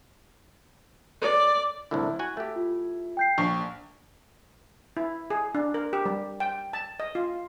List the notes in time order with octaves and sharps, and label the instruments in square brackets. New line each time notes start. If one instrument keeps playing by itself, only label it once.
[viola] D5
[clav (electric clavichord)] C2 A2 D3 [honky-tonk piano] E4
[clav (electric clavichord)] F#4 F#5 G#5
A3 G4
[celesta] F4
G5 G6 C7
[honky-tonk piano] A#1 [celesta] C#6
[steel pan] E4
G#4
D4
A#4
G4
G3
G5
A5
D#5
F4